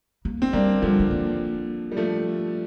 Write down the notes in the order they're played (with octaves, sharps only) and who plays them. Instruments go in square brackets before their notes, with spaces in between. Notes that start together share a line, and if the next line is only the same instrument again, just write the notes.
[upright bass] A#3
[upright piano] C4
[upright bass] G3 [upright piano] A#3 D4
[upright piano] D3 F3 [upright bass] G3
[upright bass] C4
A#3
[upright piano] G3
F3 A3